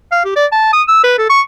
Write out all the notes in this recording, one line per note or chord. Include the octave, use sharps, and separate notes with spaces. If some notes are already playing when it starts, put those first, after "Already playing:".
F5
G4
D5
A5
D#6
E6
B4
A4
C#6